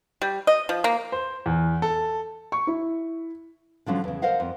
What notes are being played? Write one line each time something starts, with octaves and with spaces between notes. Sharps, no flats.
G3
D#5
F3
A#3
C5
E2
A4
C#6
E4
D3 F3 F#3 C#4
E2 C#3
A#4 C5 D#5 F5 F#5
F2